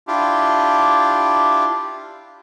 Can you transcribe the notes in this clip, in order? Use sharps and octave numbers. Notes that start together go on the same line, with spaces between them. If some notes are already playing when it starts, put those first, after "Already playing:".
D4 E4 F4 G4